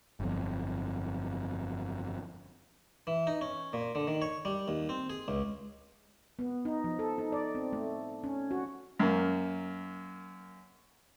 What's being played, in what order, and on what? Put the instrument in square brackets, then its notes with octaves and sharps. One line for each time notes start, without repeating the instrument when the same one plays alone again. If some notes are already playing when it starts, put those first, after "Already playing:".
[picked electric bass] G1 F2
[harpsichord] E3
D#4
C#4
A#2
D3
D#3
C#5
G3
D#2
C4
G#4
C#2
[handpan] B3
D#4
F3
A4
D#4
D5
C4
A3
C#4
F#4
[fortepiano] F#2 A#3